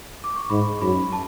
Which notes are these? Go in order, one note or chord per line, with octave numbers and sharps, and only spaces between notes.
D6
C#6
G#2 B5
F#2 B5
A5